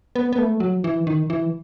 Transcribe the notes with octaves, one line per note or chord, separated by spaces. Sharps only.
B3
B3
A3
F#3
E3
D#3
E3